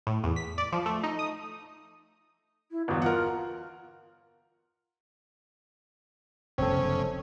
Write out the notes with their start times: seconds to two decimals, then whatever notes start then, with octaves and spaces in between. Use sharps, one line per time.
0.07 A2
0.24 E2
0.36 B6
0.58 D5
0.72 F3
0.86 A3
1.03 D#4
1.19 D#6
2.71 E4
2.88 G1 E2 F#4
3.02 F4 A#4 F#5
6.58 F1 B1 F#2 C#3 C4 C#4 A4